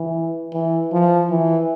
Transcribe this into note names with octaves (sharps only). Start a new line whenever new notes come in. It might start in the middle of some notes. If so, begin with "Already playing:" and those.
Already playing: E3
E3
F3
E3